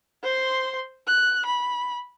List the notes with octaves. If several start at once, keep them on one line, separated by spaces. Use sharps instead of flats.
C5 C6
F#6
B5